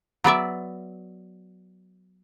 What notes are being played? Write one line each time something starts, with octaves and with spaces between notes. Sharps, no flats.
F#3 B3 D5 E5